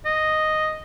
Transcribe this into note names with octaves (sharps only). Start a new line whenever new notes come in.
D#5